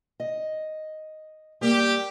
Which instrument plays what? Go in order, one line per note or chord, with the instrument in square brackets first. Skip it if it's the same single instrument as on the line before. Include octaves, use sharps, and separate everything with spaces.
[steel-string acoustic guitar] D#5
[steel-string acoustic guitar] G3 A#3 [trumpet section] G4